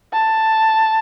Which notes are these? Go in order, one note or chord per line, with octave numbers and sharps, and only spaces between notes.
A5